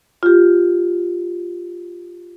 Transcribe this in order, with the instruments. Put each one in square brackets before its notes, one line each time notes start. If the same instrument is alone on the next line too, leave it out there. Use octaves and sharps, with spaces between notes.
[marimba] F4 G4